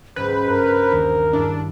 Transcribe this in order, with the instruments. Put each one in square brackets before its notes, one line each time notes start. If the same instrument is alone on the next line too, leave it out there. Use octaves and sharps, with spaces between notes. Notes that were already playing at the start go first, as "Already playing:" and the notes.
[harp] C#2 G#2 F#3 [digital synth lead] B4 [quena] C5
[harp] G2 [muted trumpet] A#4
[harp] D#2
[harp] G2 E4 D5 [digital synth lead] D4